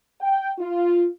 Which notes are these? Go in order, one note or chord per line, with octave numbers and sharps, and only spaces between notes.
G5
F4